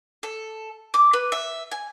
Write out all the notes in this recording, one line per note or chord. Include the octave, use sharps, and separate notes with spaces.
A4
D6
B4
E5
G#5